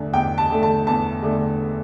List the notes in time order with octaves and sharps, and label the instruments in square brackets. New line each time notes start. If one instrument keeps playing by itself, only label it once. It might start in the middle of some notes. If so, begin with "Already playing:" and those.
Already playing: [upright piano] E2 D3 A3
E2 G5
A5
D3 A3
A5
E2 A5
D3 A3